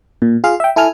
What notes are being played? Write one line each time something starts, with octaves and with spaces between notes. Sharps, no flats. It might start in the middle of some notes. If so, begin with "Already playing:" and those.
A#2
F4 G#4 F5
E5 G5
E4 A4 G#5 F6